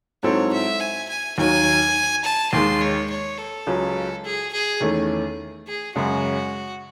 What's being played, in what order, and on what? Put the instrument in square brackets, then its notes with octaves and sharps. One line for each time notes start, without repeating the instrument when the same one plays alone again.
[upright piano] G#2 F#3 C4 E4 A4 [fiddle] C#5
[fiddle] E5
G#5
G#5
[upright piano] D#2 D#3 F#3 [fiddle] G#5
[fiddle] A5
[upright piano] D#2 D#3 G#3 [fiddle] C6
[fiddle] C#5
C#5
A4
[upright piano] C#2 C#3 F#3 C#4
[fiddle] G#4
G#4
[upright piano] E2 D#3 A3 C#4
[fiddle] G#4
[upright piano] F#2 C#3 G#3 [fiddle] F#4